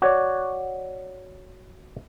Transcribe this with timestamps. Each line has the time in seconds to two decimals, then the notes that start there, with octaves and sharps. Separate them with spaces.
0.02 F#4 C#5 D5